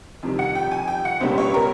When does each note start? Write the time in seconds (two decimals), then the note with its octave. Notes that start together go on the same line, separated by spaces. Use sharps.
0.23 F2 C3 D#3 G3
0.39 F#5
0.55 G5
0.71 G#5
0.88 G5
1.05 F#5
1.20 C#2 B2 G3 A#3 C#4 C5
1.38 C#5
1.54 A#4